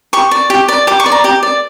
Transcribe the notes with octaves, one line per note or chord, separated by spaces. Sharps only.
G4 C#6
D5
G4
D5
G4 D6
C#6
D5
A#5
G4 D6
D5